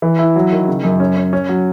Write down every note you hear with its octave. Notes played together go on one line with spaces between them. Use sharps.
E3
E4
F#3
D#3
C#3
F#2
C#4
C#4
C#4
F#3